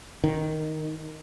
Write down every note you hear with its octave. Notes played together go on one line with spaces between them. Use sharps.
D#3